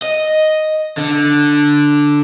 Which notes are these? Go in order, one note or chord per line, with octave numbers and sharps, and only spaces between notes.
D#5
D3